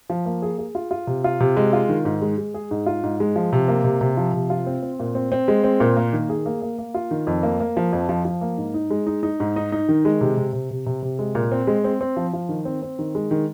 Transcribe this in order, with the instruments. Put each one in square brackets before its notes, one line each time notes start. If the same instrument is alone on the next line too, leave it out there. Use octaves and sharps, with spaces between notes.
[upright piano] F3
A#3
G#4
G#4
F4
F4
C3
F4
C3
G#3
F4
D#3
G#2
G#3
G#3
G#4
G#2
F4
G#2
G#3
F3
C3
A#3
C3
C3
F3
C3
F4
C4
C4
A#2
C4
C4
G#3
C4
A#2
A#3
D#3
G#4
A#3
A#3
A#3
F4
D#3
F2
A#3
A#3
F3
F2
F3
F3
A#3
G#2
D#4
G#3
D#4
D#4
G#2
D#4
D#4
D#3
G#3
C3
C3
C3
C3
C3
C3
G#3
A#2
C4
G#3
C4
C4
F3
F3
D#3
C4
C4
D#3
G#3
D#3